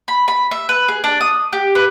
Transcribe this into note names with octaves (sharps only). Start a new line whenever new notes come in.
B5
B5
E5
B4
G#4
D4
D#6
G4
B4